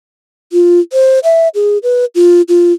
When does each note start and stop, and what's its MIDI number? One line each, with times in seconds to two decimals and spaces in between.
0.53 0.80 65
0.93 1.19 72
1.24 1.48 76
1.55 1.78 68
1.83 2.05 71
2.15 2.42 65
2.48 2.73 65